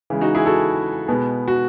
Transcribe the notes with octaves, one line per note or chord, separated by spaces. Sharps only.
C#3 E3 G#3
D#4 F#4
E4 G#4
F#4 A4
B2 G#3 B3
F#4